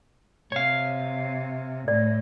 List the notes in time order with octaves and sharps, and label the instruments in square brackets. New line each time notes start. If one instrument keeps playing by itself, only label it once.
[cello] C3 [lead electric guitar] C#5 F5
[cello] A2 [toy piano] D5